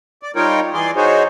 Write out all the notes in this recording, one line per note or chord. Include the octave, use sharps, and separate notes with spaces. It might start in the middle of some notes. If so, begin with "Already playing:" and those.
D5
G3 D#4 F4 A#4 C#5 G5
E3 G#4 D5 C6
D#4 F#4 G#4 C5 C#5